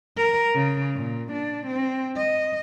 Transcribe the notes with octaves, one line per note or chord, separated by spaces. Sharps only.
A#4
C#3
A#2
D4
C4
D#5